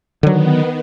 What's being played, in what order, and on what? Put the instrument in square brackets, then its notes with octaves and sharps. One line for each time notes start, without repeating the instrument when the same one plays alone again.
[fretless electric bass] D3 F#3 [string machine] D#3 B3